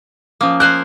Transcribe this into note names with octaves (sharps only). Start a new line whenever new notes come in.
F3 A#3 C#4 D#6
A#4 C5 G#5 F#6